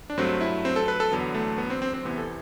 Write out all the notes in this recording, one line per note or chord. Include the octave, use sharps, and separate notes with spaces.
D4
G2 F#3 A3 C4
E4
C4
A4
B4
A4
E2 D3 F#3 B3
A3
B3
C4
C4
C4
E2 C3 E3 B3
A4